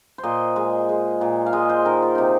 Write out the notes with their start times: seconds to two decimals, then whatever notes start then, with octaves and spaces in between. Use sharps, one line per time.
0.18 C5
0.23 A#2 D#5
0.56 G#3
0.89 G#3
1.21 A#2
1.46 F5
1.53 G#3 D#5
1.69 C5
1.85 D#3 A#4
2.02 F4
2.15 C3 D#4